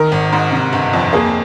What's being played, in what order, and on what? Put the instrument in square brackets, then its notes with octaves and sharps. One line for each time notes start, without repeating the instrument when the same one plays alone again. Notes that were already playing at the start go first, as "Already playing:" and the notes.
Already playing: [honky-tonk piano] D#3 [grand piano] A#4
[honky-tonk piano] G#1
G#2
C3
G1
F2
[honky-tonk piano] A#3 [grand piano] G#4